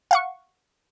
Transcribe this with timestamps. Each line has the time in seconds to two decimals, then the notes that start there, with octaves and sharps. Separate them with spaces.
0.11 F5 F#5 C#6